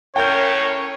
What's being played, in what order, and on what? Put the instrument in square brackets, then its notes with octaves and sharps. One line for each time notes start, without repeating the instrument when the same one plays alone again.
[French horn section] A2 C#4 [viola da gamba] A#4 [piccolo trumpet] C#5 [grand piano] G5 G6